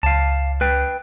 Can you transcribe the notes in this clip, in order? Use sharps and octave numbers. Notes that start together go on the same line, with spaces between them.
C#2 F5 A5
B4 G5